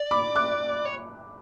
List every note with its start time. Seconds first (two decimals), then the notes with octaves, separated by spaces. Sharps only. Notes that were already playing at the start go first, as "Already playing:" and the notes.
Already playing: D5
0.11 B5 D6
0.36 D6 F#6
0.85 C#5